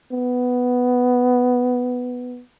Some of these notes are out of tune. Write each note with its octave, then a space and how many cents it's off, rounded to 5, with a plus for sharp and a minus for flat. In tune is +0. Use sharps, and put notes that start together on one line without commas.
B3 +5